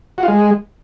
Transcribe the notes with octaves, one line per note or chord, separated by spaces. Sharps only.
F#4
F4
G#3